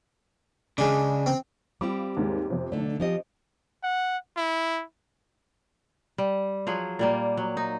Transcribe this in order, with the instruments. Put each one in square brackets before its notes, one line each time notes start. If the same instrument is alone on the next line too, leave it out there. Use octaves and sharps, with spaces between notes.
[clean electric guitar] C#3 [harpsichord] G#3 D4
[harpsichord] C4
[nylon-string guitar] G3 C4 G4 [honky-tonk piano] F4 B5 D6
[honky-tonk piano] D#2 G#2 G#3
F2 C3
[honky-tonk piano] B1 D5 [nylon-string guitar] D3 A3
[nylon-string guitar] F3 G4 D#5 [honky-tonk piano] C4
[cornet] F#5
E4
[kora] G3
F3 F#3 G#4
A#2 G3 A#3
F#3
D#4